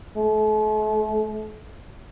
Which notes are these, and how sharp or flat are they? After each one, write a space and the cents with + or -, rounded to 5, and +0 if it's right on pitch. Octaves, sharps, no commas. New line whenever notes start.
A3 -40